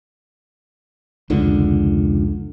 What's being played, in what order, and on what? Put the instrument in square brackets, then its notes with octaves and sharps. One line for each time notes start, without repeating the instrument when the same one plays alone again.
[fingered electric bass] F1 C#2 D3